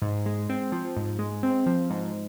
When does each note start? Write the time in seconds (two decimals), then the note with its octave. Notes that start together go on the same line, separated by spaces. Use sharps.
0.02 G#2
0.26 G#3
0.49 C4
0.72 F3
0.97 G#2
1.19 G#3
1.43 C4
1.66 F3
1.90 G#2